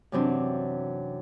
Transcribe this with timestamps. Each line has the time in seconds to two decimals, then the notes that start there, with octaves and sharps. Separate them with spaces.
0.12 F#2 C3 E3 C4 D4